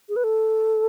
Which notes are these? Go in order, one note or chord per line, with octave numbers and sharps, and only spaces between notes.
G#4
B4
A4